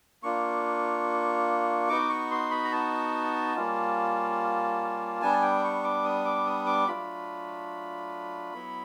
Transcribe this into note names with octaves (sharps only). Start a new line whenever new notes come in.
A#3 D4 F4 C#6
B3 D#4 F#4 D6
C#6
C6
B5
A#5
A5
G3 A#3 C#4 F4
G3 B3 D4 G#5
G5
C#6
D6
D#6
D6
D#6
D6
F#3 A3 D4 F4 B5
F#3 B3 E4